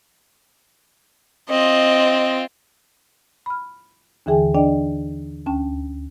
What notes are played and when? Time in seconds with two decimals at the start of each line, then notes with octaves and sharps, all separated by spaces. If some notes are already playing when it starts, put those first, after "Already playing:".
1.50 C4 F4 D#5
3.46 B5 F6
4.26 D#2 D3 E3 G#4 G5 G#5
4.55 D4 D5 D#5 G5
5.46 D2 C#4 G5 A5